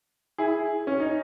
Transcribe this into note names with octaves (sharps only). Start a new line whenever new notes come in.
E4 G#4
C#4
D#4